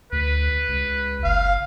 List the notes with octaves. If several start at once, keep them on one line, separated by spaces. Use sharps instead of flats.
D2 B4
C#2
F#1 F5